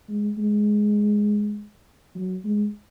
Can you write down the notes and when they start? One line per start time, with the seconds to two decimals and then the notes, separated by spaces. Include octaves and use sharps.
0.09 G#3
0.38 G#3
2.15 F#3
2.44 G#3